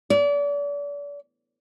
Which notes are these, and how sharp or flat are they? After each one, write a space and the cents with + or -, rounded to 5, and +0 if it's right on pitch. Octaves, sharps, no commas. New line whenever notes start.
D5 -35